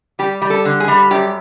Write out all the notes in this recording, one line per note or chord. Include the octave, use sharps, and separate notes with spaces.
G3 G4
G3
A4
D3
G#4
G3
F#2 G4